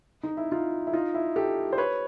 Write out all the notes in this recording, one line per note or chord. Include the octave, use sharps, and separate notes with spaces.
D#4
E4
D#4 F4
E4
D#4 F4
E4
G4 A4
C5
B4 C#5